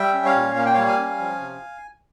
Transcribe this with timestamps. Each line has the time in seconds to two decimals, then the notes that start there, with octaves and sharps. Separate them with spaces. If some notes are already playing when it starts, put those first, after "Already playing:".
Already playing: G3 E5 G5
0.14 C#4
0.25 C#5 F5
0.36 A#2
0.55 A#3 F5
0.65 G5
0.74 G3 C#5 F5
0.87 F5 G#5
0.98 C#4
1.20 F3
1.40 C3